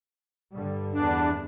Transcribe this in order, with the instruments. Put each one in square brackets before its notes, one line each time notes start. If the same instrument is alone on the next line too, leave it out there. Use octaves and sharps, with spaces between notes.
[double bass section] G2 D3 G3
[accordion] E2 D4